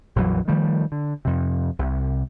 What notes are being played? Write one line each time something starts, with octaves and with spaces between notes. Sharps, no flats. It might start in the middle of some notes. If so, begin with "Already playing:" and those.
A#1 F2 E3 F#3
D#3 F3 G3 A3
D3
F2 C3
C2 C3